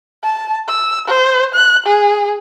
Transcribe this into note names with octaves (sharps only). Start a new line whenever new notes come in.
A5
E6
C5
F#6
G#4